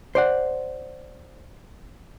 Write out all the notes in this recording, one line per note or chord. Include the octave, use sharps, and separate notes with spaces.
C5 D5 F#5